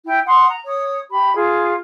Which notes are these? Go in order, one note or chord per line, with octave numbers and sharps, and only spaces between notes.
E4 G5
F#5 C6 D#6
A#5
C#5 D#6
G4 B5
F4 G#4